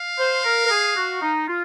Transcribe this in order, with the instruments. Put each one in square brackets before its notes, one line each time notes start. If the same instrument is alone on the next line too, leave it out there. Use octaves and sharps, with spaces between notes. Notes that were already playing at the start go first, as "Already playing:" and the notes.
Already playing: [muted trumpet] F5
[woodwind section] C5
A#4
A#4
G#4
F#4
D#4
F4